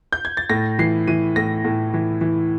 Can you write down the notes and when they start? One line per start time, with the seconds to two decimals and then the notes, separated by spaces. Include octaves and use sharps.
0.13 G6
0.25 G#6
0.37 A6
0.49 A2 A#6
0.79 E3 C7
1.07 E3 D#7
1.36 A2 A#6
1.64 A2
1.94 E3
2.21 E3